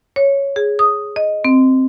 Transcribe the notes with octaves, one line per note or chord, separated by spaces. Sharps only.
C#5
G#4
D#6
D#5
C4